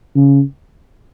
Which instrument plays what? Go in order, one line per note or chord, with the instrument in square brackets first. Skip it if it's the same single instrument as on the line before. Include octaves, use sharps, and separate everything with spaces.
[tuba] C#3